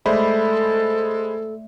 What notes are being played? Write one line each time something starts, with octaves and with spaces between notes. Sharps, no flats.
G#3 A3 A4 C5 D5 E5 B5